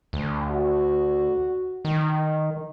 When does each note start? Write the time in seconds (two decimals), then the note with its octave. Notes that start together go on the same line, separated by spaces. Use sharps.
0.13 D2
0.51 F#4
1.85 D#3